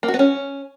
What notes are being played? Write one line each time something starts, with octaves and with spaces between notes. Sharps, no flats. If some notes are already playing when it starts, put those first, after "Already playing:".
A#3
F#4
B3
C#4